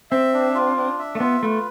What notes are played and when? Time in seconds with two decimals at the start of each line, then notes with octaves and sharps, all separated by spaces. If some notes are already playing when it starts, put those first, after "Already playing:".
0.11 C4 E5
0.34 D4
0.55 F4
0.77 D4
0.99 E5
1.15 A3
1.20 B3 F4
1.43 A3 B4